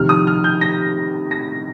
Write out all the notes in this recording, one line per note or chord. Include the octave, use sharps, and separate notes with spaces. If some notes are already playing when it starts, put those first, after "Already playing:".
Already playing: F2 C3 D#3 F6
D#6
F6
G6
A#6
A#6